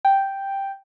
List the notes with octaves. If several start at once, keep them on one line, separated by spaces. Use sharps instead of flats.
G5